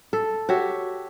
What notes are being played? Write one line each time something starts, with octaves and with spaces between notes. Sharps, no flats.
A4
F#4 G4 C#5 E5